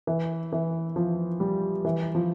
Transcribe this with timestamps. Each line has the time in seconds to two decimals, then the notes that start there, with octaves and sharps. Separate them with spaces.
0.07 E3
0.52 E3
0.96 F3
1.40 G3
1.85 E3
2.15 F3